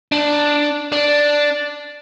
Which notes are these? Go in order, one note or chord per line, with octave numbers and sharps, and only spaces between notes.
D4
D4